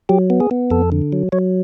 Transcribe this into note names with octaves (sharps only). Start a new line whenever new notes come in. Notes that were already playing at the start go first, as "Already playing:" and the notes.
F#3 G4
B3
G#4
B3
F2 A4
D3
F#3
F#3 C#5